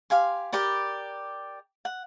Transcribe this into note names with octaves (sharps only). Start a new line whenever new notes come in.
G4 F5 G#5 C6
G4 A#4 D5 B5
F#5